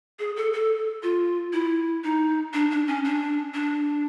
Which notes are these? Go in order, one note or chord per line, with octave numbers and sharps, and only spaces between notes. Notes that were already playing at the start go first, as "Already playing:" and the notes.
G#4
A4
A4
F4
E4
D#4
D4
D4
C#4
D4
D4